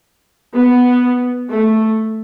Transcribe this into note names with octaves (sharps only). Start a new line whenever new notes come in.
B3
A3